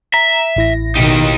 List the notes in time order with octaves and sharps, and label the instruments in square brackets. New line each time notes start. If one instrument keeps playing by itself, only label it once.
[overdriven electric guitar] E5 [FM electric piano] A#5
[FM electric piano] A1 E4 A#6
[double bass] B2 D#3 [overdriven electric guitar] D#4 G4